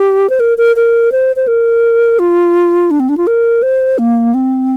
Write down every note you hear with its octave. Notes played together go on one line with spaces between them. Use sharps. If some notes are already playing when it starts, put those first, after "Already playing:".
Already playing: G4
C5
A#4
A#4
A#4
C5
C5
A#4
F4
D4
C4
D4
F4
A#4
C5
A#3
C4